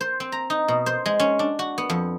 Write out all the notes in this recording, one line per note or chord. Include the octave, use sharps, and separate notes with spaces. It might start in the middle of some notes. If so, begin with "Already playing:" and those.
C5
C4
A#5
D#4
B2
C5
G#3
C#4
D4
F#4
B3
F2